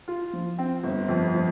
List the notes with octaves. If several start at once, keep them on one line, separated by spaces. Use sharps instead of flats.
F4
F3
C4
G1
F2
F3